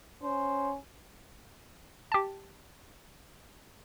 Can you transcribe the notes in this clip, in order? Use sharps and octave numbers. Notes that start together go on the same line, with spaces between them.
C#4 C5
G4 A5